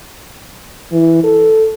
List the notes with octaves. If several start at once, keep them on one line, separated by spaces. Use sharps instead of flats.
E3
A4